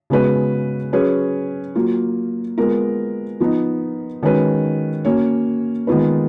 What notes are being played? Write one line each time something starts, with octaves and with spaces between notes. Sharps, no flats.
C#3 G#3 B3 F#4 B4
F#3 C#4 G#4 B4
F#3 A#3 F4
G#3 B3 F4 A#4
F3 B3 D#4
D#3 G#3 C#4 F#4 B4
A#3 C#4 F#4 C#5
D#3 G#3 B3 F4 B4